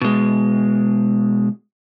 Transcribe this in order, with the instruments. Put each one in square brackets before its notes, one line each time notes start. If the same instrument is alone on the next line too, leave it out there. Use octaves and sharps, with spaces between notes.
[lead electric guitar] B2 G#3